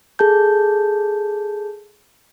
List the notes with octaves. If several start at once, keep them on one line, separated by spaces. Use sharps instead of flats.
G#4 A4 A5 G6